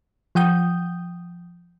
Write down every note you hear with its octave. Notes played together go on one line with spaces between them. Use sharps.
F3 F#5 G5 D#6 G6